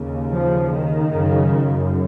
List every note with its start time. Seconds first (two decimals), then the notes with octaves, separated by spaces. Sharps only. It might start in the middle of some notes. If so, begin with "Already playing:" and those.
Already playing: D#2 C#3
0.29 F3
0.70 D#3
1.10 F#2 C#3